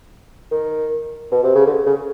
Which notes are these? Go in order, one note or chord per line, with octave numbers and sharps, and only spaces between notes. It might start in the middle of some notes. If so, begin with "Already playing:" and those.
D#3
B2
C3
C#3
D3
C#3